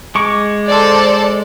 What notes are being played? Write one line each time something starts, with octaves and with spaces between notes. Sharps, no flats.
G#3 C#6 D6
A4 C5 D5